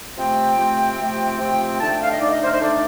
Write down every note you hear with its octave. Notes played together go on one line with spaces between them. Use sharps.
C3 F3 A3 C4 G5
C3 F3 A3 C4
C3 F3 A3 C4
C3 F3 A3 C4 G5
D3 A3 D#4 A5
G5
F5
D#5
D3 A3 D#4 D5
D#5
C5
A#4
C5
D3 A3 D#4 D5